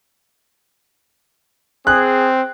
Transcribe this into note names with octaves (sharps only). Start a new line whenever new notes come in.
C4 G#4 F#6